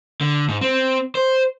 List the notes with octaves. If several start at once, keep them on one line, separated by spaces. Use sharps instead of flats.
D3
G#2
C4
C5